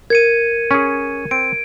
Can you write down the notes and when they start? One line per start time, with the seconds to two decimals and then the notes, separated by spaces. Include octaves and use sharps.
0.10 A#4 G#6 C#7 D#7
0.71 C#4 G#4
1.31 C4 D7